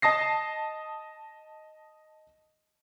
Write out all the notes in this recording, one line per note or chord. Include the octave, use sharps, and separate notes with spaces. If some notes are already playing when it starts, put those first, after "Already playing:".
D#5 A5 D#6 A#6 C7